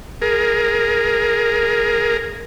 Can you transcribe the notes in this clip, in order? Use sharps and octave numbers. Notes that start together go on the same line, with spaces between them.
G#4 A#4